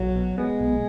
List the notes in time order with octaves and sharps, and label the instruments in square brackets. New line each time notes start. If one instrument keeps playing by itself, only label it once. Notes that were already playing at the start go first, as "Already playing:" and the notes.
Already playing: [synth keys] B1 [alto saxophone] F#3
[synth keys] B2
[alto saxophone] G#3 [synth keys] B3
[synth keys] B1